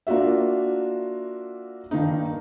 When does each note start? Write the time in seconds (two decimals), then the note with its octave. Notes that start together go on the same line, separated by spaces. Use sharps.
0.07 A#3 D4 F4 F#4 E5
1.91 G2 D#3 A#3 D#4